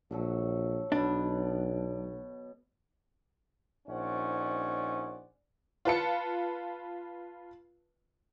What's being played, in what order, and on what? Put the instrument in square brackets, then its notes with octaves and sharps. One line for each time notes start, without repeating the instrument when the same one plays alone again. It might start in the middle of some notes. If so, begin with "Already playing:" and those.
[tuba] A#1 [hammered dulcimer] D3 F#3 A4
[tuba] B1 [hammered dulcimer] B2 F#3 B3 [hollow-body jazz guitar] D4
[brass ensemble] A#1 C#4 D#4 C5 D5 F#5
[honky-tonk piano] F4 B4 A5 C#7